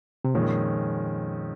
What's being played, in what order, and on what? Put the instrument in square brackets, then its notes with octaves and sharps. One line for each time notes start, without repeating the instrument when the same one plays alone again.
[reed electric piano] C3
[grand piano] F2 D#3 G#3 C#4 [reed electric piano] A#2